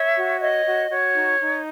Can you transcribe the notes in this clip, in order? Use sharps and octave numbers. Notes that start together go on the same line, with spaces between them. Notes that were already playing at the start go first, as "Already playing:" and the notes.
Already playing: C#5 E5
F#4
C#5 D#5
F#4
F#4 C#5
D#4
D#4